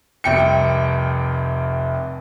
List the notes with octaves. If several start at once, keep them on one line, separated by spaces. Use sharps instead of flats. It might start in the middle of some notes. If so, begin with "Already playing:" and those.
F1 C2 G5 C#7